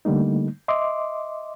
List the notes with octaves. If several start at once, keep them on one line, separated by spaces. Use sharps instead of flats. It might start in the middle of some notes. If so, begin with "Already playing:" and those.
D3 G3 A3 A#3 D#4
D#5 E5 C6 D6